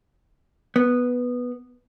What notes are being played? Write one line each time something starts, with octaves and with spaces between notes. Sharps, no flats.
B3